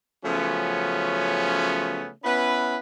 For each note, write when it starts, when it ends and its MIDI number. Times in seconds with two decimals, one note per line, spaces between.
0.24 2.09 49
0.24 2.09 53
0.24 2.09 54
0.24 2.09 57
0.24 2.09 59
0.24 2.09 61
2.24 2.77 59
2.24 2.77 61
2.24 2.77 64
2.24 2.77 71